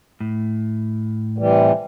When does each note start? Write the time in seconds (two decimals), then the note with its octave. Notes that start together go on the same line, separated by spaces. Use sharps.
0.20 A2
1.38 C3 E3 G3